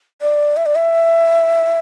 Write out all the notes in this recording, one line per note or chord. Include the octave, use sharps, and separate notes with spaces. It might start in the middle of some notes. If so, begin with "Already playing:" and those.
D5
E5
D5
E5